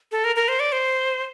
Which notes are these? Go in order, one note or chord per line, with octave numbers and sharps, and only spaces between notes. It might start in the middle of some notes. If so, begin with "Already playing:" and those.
A4
A#4
A#4
C5
D5
C5